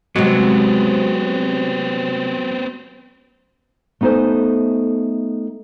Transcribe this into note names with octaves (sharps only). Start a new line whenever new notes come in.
C3 F#3 G#3 B3 C4
A3 B3 D#4 A4 C5 G#5